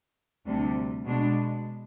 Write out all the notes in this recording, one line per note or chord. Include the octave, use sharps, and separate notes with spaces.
D2 C3 G3 D4
B2 G#3 D4